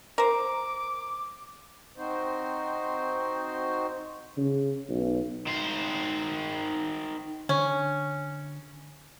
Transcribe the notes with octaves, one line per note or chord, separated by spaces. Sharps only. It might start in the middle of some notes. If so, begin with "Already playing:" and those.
A#4 C5 D6
C4 D#4 F#4 C5
C#3
B1
D#3 C5
D3 C#4